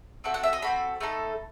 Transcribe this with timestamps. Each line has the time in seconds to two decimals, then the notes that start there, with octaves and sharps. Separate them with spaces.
0.24 C4 F#4 A4 E5
0.34 F#5
0.43 E5
0.53 D#5
0.62 C4 F#4 A4 B5
1.01 A3 D#4 A4